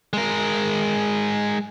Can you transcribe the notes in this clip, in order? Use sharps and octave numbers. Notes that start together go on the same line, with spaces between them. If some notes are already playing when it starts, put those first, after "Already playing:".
G#3 A#4